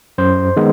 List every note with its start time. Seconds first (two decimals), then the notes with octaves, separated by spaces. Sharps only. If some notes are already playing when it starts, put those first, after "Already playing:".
0.18 F#2 C5
0.56 D#3 G#3 B3